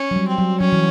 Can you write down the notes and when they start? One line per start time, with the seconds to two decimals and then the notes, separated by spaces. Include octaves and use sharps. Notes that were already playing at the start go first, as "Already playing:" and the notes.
Already playing: C#4
0.11 F#3
0.16 G3
0.28 C4
0.38 F#3
0.60 F#3 C#4
0.72 E3